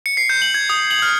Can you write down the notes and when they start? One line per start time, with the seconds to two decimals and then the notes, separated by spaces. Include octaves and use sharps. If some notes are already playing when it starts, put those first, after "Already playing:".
0.06 C#7
0.17 C7
0.29 G6
0.42 F#7
0.54 G#6
0.70 D#6
0.91 F#7
1.02 F6